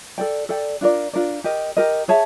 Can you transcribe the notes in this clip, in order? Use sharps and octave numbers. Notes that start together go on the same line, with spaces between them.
A4 D5 G5
A4 D5 G5
D4 F4 A#4 D5
D4 F4 A#4 D5
G4 A#4 D#5
G4 A#4 D#5
G#4 C#5 E5 A5